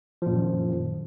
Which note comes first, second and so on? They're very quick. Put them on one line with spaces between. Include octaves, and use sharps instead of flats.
F3 A#2 F#2 D#3